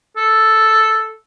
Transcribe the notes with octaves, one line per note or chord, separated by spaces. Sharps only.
A4